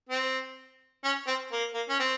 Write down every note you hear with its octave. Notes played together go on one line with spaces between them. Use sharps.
C4
C#4
C4
A#3
A#3
C#4
C4